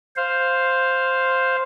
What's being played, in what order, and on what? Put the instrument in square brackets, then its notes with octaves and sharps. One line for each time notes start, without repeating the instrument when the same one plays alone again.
[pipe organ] C5 F5